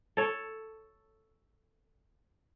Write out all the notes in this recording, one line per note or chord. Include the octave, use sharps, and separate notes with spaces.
A4 C#5